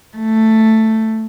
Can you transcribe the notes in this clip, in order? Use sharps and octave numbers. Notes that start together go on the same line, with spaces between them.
A3